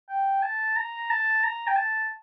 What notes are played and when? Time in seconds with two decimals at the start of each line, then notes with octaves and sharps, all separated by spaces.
0.09 G5
0.42 A5
0.76 A#5
1.10 A5
1.43 A#5
1.67 G5
1.76 A5